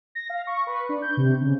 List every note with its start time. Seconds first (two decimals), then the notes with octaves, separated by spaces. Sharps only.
0.15 A#6
0.30 F5
0.47 C#6
0.67 B4
0.89 D4
1.02 G6
1.17 C3
1.42 C#3